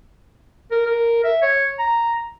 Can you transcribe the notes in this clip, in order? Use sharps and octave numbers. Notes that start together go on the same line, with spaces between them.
A#4
A#4
E5
C#5
A#5